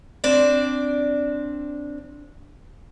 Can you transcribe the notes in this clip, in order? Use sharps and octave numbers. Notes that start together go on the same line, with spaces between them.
C4 D4 D5